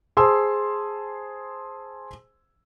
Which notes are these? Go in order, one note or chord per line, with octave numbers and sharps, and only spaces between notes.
G#4 C5 A5 C6 E6